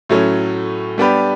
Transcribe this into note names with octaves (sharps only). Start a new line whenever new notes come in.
A2 F#3 A3 C#4
G3 B3 D4 G4 B4